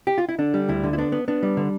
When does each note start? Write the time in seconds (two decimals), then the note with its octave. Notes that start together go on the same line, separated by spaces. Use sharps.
0.07 G4
0.18 F4
0.29 E4
0.38 D3 D4
0.54 G3
0.69 D2 E4
0.84 D3
0.93 E4
0.98 B3 D4
1.12 B3
1.28 B3 D4
1.43 G3
1.57 D3